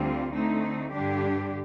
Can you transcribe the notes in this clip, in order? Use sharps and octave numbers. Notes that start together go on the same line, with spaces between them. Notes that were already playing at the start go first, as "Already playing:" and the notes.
Already playing: D2 D3 G3 C4 F4
D3 A3 C4 D#4
G2 D3 G3 D4 G4